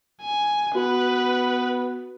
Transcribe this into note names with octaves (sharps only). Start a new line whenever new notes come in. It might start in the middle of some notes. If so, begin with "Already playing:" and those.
G#5
B3 F#4 B4